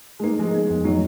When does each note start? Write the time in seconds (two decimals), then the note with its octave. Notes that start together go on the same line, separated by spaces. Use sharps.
0.19 G#3
0.23 A#3 D#4
0.39 F3 G#3
0.54 B3
0.70 F2
0.84 F#3 D#4